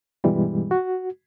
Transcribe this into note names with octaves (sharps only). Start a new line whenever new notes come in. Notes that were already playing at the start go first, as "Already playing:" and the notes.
G2 B2 E3 G3 G#3
F#4